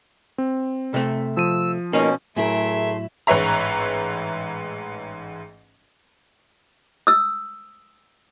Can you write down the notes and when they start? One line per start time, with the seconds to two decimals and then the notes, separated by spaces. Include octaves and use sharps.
0.38 C4
0.94 C3 A3
1.37 F3 E6 D#7
1.93 B2 A#3 C#4 D#4
2.36 A2 F#3 A3 E4 G#4 A#4 E5 C6
3.27 A1 G#2 B4 C#5 E5 A#5
7.07 D#6 E6